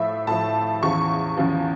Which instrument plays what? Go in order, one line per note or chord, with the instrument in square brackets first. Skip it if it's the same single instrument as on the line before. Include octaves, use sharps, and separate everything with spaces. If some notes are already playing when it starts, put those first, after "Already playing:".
Already playing: [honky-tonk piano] A2 F3 E5
A2 F3 A5
E2 C#3 F3 C#6
E2 C#3 F3